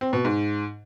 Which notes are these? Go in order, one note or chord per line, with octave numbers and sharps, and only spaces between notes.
C4
B2
G#2